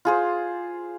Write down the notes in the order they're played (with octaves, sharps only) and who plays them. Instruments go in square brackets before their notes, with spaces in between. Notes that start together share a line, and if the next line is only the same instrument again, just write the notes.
[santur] F4 G#4 C5